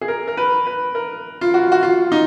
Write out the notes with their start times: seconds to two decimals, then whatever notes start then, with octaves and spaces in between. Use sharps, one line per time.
0.01 G#4
0.08 A#4
0.28 A#4
0.37 B4
0.67 B4
0.95 A#4
1.41 F4
1.54 F#4
1.72 F#4
1.83 F4
2.12 D#4